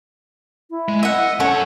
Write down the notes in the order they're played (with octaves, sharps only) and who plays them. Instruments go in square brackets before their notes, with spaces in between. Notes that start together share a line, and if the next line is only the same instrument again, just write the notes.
[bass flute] E4
[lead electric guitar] G#3
[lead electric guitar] D#5 [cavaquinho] E5 F#5
[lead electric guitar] F#2 F#5 [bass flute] C#4 [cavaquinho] A4 C#5